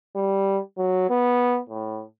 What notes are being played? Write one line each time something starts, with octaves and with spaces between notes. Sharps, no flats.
G3
F#3
B3
A2